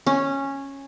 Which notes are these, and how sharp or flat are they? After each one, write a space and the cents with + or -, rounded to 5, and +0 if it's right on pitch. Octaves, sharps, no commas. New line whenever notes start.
C#4 -10